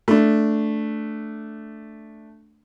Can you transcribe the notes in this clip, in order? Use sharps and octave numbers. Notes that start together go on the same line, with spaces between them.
A3 D4